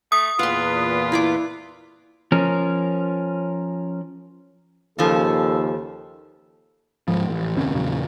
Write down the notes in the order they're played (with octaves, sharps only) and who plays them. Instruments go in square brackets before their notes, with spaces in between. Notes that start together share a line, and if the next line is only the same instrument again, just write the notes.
[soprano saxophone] A3 [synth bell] D#6
[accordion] E2 A#2 B4 [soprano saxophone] F4 [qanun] F#5 C6
[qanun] E4 D5 D6
[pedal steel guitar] F3 C#4 A#4
[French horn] D#2 [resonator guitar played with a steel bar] C#3 F3 [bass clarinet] A4
[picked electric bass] D1 G#2 F3
A1
F#1 D#2 C3 C#4
E2 A#2 C#3 F#3